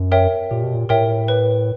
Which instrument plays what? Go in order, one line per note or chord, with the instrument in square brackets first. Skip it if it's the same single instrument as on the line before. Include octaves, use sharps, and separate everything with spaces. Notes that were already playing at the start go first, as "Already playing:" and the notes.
Already playing: [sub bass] F#2
[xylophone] A#4 C#5 E5 G5
[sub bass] A#2 [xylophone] G4
[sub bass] B2
A#2
[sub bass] A2 [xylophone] A#4 C#5 E5 G5
[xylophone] B4